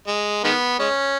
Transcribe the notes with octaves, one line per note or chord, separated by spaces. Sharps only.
G#3
D#3 G#3 B3
G#3 C#4